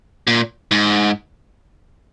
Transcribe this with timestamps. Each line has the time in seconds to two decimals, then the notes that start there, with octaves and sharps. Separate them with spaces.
0.27 A#2
0.71 G#2